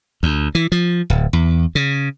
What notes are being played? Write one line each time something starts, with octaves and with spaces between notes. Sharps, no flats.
D2
E3
F3
D1
E2
C#3